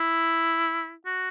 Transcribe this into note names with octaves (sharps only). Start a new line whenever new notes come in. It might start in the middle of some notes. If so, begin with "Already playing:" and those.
Already playing: E4
F#4